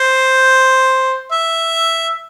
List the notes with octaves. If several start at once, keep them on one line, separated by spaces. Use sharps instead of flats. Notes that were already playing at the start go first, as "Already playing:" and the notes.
Already playing: C5
E5